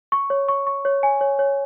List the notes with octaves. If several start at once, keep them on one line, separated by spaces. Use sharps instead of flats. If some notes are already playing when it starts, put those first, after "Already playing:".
C#6
C#5
C#6
C#6
C#5
G#5
C#5
C#5